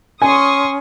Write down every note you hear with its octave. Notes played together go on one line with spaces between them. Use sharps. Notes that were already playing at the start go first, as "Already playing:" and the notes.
C#4 G#5 C6 C#6 D#6